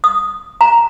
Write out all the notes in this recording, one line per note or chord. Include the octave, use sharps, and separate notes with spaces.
D#6
A#5